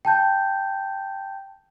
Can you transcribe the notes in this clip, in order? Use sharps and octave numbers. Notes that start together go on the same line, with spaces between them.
G5 A5 G6